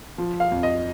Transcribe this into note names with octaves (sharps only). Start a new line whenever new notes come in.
F3
F5
F2
D#5